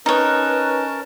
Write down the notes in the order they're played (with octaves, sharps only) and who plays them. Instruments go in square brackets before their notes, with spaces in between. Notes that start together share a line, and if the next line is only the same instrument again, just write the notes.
[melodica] C#4 A#4 A5 [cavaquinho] D#4 C#5 [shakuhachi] B4